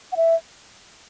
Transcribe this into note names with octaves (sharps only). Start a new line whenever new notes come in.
F#5
E5